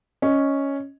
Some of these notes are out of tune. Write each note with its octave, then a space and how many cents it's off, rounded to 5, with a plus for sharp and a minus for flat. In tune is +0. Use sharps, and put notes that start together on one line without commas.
C#4 +0 D#5 +0